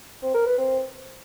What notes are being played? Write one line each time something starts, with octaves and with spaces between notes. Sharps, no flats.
C4
A#4
B4
C4